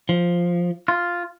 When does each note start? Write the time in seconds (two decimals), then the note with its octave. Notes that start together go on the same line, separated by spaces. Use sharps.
0.09 F3
0.88 F4